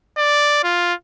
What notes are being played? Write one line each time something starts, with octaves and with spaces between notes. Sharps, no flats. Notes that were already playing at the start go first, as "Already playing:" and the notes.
D5
F4